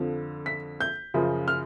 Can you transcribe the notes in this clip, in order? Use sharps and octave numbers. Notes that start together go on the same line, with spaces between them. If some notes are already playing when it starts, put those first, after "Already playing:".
Already playing: F2 D3 F3
B6
G6
F#2 C#3 F3
F6